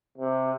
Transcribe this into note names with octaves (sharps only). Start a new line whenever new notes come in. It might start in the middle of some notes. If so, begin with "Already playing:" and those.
C3